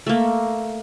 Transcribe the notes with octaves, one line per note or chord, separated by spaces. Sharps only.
A3 A#3